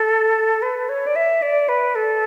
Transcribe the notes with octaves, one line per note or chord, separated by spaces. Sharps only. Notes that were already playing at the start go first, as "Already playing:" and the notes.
Already playing: A4
B4
C#5
D5
E5
D5
B4
A4